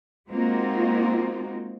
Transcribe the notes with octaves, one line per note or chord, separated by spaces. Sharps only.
G#3 A#3 C4 D#4 F4 F#4